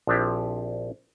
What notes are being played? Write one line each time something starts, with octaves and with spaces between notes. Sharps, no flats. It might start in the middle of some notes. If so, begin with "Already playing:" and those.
A#1 F3 C4 D4 E4 G4